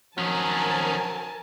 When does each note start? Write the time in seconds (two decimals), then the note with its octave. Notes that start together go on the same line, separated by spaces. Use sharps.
0.18 D#3 F3 F#3 C#4 A#4 G#5 A5